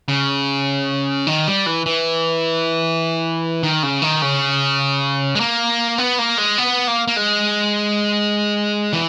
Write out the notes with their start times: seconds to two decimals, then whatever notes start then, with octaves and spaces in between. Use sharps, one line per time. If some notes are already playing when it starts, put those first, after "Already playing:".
0.08 C#3
1.27 D#3
1.47 G3
1.66 E3
1.86 E3
3.63 D#3
3.83 C#3
4.02 D#3
4.22 C#3
5.35 G#3
5.40 A#3
5.98 B3
6.19 A#3
6.38 G#3
6.58 B3
6.87 A#3
7.08 A#3
7.16 G#3
8.93 E3